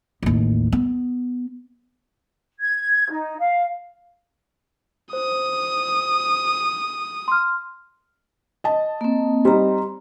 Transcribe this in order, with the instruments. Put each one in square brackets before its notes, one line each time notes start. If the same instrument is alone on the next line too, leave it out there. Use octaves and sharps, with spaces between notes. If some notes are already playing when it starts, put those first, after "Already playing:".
[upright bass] A1 D#2
B3
[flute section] G#6
D#4
F5
[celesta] C5 [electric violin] D#6
[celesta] C6 F6
[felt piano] D#5 A5
[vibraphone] A#3 C4
[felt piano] G3 C4 D#4 [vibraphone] A#5 C6